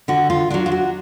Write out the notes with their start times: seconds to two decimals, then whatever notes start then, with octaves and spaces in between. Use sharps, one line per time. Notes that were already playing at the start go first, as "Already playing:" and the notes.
0.08 D3 F#4
0.30 F4
0.50 F#3 D4 F4
0.66 F4
0.72 F#4